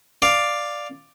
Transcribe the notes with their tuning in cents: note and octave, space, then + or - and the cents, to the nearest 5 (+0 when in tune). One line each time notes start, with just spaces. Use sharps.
D5 +5 F5 +0